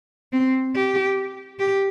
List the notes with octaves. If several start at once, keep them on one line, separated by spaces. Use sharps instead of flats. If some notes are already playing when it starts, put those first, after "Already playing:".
C4
G4
G4